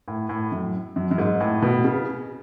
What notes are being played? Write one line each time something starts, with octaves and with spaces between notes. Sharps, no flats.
A2
A2
F#2
F#2
F#2
G#2
A2
B2
C#3